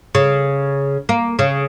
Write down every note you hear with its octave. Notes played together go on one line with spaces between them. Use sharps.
C#3
A#3
C#3